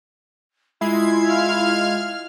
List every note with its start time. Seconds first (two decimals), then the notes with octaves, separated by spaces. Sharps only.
0.81 G#3 E4 F4 G#6 C7
1.27 F5 F6